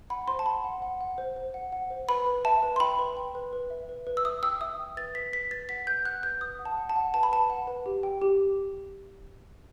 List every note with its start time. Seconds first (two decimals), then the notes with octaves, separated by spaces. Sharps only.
0.10 F#5 B5
0.28 C5 C6
0.39 A5
0.46 F#5 B5
0.64 F#5
0.82 F#5
1.01 F#5
1.18 C5
1.36 C5
1.54 F#5
1.72 F#5
1.90 C5
2.08 B4 B5
2.26 B4
2.45 E5 A5
2.63 B4
2.76 C6
2.80 G5 B5
2.99 B4
3.17 G5
3.35 B4
3.53 B4
3.70 E5
3.89 B4
4.07 B4
4.17 E6
4.25 E5 D#6
4.43 G5 E6
4.61 E5 D#6
4.79 G5
4.97 B4 A6
5.15 B4 B6
5.33 B4 B6
5.51 B4 A6
5.69 F#5 B6
5.87 B4 G6
6.05 F#5 F#6
6.23 B4 G6
6.41 B4 D#6
6.59 F#5
6.65 A5
6.77 F#5
6.89 A5
6.96 F#5
7.14 B4 A5
7.23 B5
7.32 B4 A5
7.50 F#5
7.67 B4
7.86 G4
8.03 G5
8.22 G4